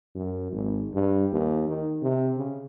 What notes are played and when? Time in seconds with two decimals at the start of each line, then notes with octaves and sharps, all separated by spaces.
0.15 F#2
0.52 G#1
0.94 G2
1.32 D#2
1.69 D#3
2.02 C3
2.37 C#3